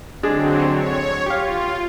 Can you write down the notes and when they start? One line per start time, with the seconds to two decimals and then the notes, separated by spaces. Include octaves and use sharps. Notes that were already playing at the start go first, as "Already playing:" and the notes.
0.23 D3 F#3 G#3 C4 D4 G#4
0.69 C#5
1.26 F4 G4 F5